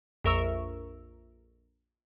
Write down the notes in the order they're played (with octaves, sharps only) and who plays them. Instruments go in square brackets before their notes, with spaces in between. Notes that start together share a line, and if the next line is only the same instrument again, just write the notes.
[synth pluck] A#1 F2 A#4 E5 C#6 E6